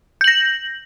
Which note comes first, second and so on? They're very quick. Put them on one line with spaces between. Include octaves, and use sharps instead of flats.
G6 F#7 A#6